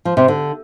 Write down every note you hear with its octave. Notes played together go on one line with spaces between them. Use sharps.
F3
C3
D3